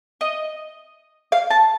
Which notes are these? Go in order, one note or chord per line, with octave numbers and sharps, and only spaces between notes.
D#5
F5
A5